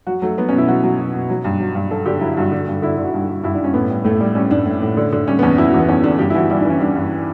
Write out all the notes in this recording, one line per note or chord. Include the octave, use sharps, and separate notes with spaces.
F#3 F#4
F#3 A3
F#3 B3
B2 C#4
E4
F#3 F#4
F#3
B2
B2
F#3
G2
F#3
G2
F#3 A4
D3 G4
F#3 E4
G2 F#4
D3
G2
D3 E4
D3
F#4
G2
G2
G2 E4
D4
G2 C#4
A2 B3
G3
A2 A3
G3
G3 C#4
A2 D4
A2
A2
D3
D3
G3 C#4
B3
E2 C#4
E2 E4
F#4
E2 B3
E2 C#4
D3 D4
G2 G4
E4
E3 F#4
G3 E4
D4
E3
C#4
G3 D4
G2